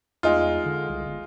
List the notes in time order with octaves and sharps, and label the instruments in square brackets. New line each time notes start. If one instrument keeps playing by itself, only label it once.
[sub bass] E2 [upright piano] G#3 D#4 F4
[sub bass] D3
C2
G1